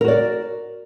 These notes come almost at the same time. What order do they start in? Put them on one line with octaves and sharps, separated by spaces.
A#4 F#4 D5